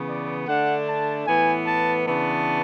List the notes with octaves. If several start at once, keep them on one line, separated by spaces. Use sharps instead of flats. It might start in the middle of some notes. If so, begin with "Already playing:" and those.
Already playing: C#3 E3 B3
D5
D3 A3 D4 F#5
A5
A2 E3 B3 G#5
A5
C#3 E3 B3 D4 A5